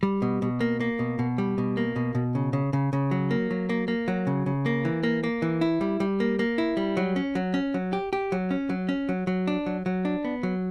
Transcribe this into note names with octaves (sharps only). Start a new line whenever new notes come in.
G3
B2
B2
A#3
A#3
B2
B2
G3
B2
A#3
B2
B2
C#3
C#3
C#3
C#3
F#3
A#3
F#3
A#3
A#3
F#3
C#3
C#3
A#3
E3
A#3
A#3
E3
E4
G3
G3
A#3
A#3
E4
G3
F#3
C#4
F#3
C#4
F#3
G4
G4
F#3
C#4
F#3
C#4
F#3
F#3
D4
F#3
F#3
D4
B3
F#3